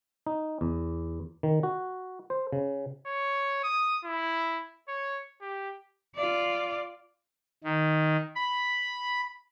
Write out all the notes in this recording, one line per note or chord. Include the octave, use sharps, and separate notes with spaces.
D#4
E2
D#3
F#4
C5
C#3
C#5
D#6
E4
C#5
G4
F4 D5
D#3
B5